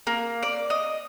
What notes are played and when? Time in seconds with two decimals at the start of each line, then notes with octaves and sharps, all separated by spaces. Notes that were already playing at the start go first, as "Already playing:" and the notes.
0.07 A#3
0.43 D5
0.70 D#5